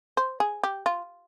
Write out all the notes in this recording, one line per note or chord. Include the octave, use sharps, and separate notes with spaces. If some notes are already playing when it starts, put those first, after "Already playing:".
C5
G#4
G4
F4